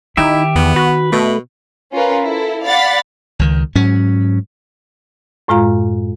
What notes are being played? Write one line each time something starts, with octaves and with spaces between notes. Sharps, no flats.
D#3 D#4 E4 G4 E5
E2 B3
F#4 B4
B2 A3
C#4 F4 A#4 B4
E4 A4
D5 F5 F#5 B5 A6 B6
C#2 D#3
G#2 F#3 C#4
F#2 A2 G#3 F4 F5 A#5